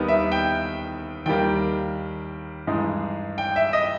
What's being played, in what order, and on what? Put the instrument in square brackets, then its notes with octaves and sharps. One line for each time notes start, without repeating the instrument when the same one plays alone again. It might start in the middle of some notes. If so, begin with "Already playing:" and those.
Already playing: [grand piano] D#2 D#3 G3 B3
E5
G5
D#2 D#3 G3 A#3 G5
G2 E3 G#3 D#4
G5
E5
D#5